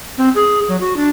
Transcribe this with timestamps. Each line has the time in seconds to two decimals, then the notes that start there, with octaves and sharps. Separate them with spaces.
0.18 C4
0.35 G#4
0.68 F#3
0.81 F#4
0.96 D4